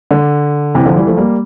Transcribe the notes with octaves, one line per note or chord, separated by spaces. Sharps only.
D3
C3 E3
D3 F3
E3 G3
F3 A3
G3 A#3